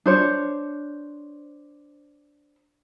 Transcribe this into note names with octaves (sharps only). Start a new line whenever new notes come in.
D4 C5 C#5